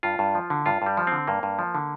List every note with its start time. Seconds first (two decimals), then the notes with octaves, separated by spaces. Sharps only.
0.03 G2 F4
0.19 G2
0.35 F3
0.50 D3
0.66 G2 F4
0.82 G2 G3
0.97 F3
1.07 D3 C4
1.27 G2 A#3
1.43 G2
1.59 F3
1.75 D3